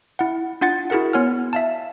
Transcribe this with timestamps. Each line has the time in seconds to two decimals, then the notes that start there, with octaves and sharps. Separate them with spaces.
0.19 E4 F#5
0.61 D4 F4 F#5 A6 C#7
0.90 E4 F#4 G#4 A#4 F#5
1.13 B3 C#5 F#5 G#5 F6
1.53 E5 F5 A5